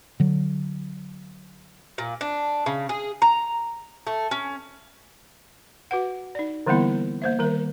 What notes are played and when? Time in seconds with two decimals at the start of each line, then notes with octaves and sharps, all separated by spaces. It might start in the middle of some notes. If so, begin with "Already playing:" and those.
0.20 D3 F#3
1.98 A#2
2.21 D4
2.66 C#3
2.89 G#4
3.22 A#5
4.07 A3
4.31 C#4
5.91 F#4 B4 F#5
6.35 D#4 D5
6.66 D3 E3 G3 A#3 B3 E4
7.22 A#3 C5 E5
7.39 D#3 G3 A#4